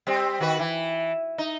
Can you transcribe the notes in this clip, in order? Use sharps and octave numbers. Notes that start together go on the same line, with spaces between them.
G3 C4
D#3 F#4 B4
E3
D#4